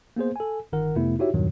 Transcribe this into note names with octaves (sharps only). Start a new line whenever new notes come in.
A#3 B3 G#4 C5
A4 G#5
G1 D#3 A#4 F#5
F2 C3 A3 B3 E4
D#4 E4 F#4 G4 C#5 E5
E2 G2 A#2 D#3 F#3